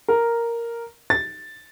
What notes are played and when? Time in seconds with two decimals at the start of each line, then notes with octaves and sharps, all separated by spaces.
0.08 A#4
1.10 A6